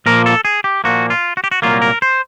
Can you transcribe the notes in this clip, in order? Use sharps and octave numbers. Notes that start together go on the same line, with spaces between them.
A#2 F3 A#3 A#4
A4
G#4
G4
A#2 F3 A#3 F#4
F4
F#4
G4
F#4
C2 A#2 F#3 A#3 F4
A#4
C5